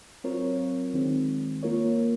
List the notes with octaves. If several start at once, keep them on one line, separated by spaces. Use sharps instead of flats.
F#3 C4 F4 A#4 C#5
D#3 G#3 C4
A#3 F4 A#4 C#5